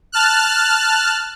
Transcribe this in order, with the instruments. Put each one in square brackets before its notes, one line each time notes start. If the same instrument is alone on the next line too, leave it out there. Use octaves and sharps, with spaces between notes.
[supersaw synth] A5 F6 F#6